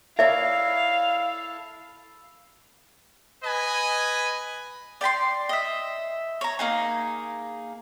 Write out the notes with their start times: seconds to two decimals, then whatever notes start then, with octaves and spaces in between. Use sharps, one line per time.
0.19 E4 A4 A#4 C#5 D5 E5 F5
3.44 B4 D#5 G#5
5.01 D5 G5 B5 C6
5.49 D#5 E5
6.41 C#5 A#5
6.59 A#3 D#4 G#4